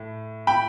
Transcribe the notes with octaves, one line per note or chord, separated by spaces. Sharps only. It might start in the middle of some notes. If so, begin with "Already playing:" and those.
Already playing: A2
G5 B5